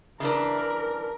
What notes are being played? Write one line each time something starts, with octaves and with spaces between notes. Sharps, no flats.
C#3 E3 D4 A#4